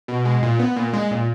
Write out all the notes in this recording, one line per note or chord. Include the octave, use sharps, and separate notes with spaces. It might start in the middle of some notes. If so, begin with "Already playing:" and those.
B2
G#3
A#2
B3
A#2
G#3
A#2